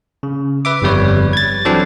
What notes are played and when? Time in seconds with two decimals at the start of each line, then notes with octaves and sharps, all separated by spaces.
0.23 C#3
0.65 B4 E5 D6
0.82 G1 F2 G3 B4 C#5
1.33 G#6 A6
1.65 E3 F#3 C4 D4 A4 D5